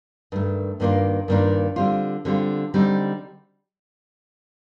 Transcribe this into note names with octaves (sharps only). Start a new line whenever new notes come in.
G2 D#3 A3
G2 D#3 A#3 D4 F4
G2 D#3 A#3 D4 F4
D3 G3 C4 F4
D3 G3 C4 F4
D3 G3 C4 D#4